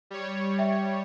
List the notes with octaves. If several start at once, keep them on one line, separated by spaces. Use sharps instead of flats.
G3 C#5
E5 G5